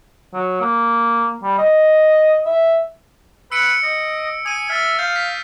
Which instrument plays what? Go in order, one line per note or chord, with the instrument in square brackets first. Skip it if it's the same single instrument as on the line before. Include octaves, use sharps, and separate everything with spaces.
[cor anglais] F#3
A#3
G3
D#5
E5
[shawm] B4 [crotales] E6 C#7 D7
[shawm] D#5
[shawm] G#5 [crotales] D#6 D#7
[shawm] E5 [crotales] F6 A6
[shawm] F5 [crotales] G6
[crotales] B6